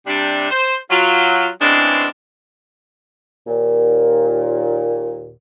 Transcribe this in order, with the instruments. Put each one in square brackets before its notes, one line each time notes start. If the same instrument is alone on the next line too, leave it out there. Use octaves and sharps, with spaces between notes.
[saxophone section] C3 G3 D4
C5
F#3 F4
C#3 E3 G#3 B3 C4 D4
[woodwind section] D#2 A#2